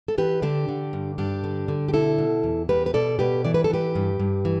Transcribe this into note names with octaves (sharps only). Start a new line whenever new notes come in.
A4
E3 G4 B4
D3 D4 G4
D3
G2
G2 D4 G4
D3
D3
G4
B2 E4 A4
B2
E2
E2 G4 B4
B4
B2 A4 D5
B2 G4 B4
E3 D5
B4
A4
E3 G4 B4
G2
G2
E3